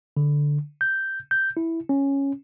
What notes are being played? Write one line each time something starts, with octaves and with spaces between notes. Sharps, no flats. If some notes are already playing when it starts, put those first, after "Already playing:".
D3
G6
G6
E4
C#4